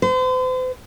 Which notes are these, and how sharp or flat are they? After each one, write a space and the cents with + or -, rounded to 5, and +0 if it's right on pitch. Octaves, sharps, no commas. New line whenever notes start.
C5 -40